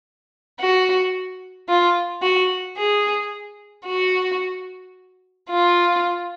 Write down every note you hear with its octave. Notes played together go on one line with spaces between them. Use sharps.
F#4
F4
F#4
G#4
F#4
F4